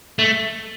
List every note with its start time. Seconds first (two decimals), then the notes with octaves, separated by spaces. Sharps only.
0.19 A3